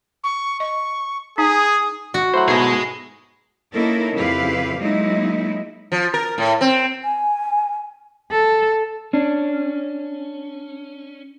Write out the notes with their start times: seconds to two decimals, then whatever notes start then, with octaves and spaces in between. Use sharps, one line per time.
0.24 C#6
0.60 D#5 C#6
1.38 D#4 G#4 D#6
2.14 F#4
2.34 F#3 A3 E4 C5 F#5
2.48 G#2 B2 G#4 D#5
3.72 A#3 C#4 D#4 E4 A4 A#4
4.14 F2 C#3 E4 G4 B4 F5
4.79 F#3 G#3 A#3 D#4 E4
5.92 F3
6.14 A#4
6.38 A2
6.61 C4
7.04 G#5
8.31 A4
9.13 C#4 D4